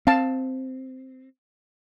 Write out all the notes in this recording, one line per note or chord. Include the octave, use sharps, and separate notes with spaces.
C4 F5 A5